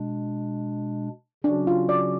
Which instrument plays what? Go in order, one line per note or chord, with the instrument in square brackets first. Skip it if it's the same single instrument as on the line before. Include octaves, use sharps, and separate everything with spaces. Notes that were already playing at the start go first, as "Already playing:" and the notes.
Already playing: [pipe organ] B2 G#3 D4
[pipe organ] C#3 F#3 C#4 F#4 [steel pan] D4
[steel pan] F4
D5